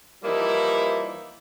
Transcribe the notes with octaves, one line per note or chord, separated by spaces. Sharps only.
E3 F3 G3 A#3 D#4 E4